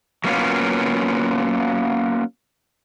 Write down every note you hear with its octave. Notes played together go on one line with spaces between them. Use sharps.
F#3 A#3 B3 C#4 F4